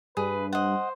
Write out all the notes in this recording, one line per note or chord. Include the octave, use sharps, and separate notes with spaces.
G2 G#4 B4
C5 D#5 F#5